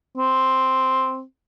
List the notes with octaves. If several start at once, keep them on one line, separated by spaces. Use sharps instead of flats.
C4